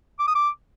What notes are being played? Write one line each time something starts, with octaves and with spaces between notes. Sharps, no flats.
D6
D#6
D6